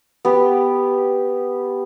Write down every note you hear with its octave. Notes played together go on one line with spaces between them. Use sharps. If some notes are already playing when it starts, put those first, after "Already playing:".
B3 G4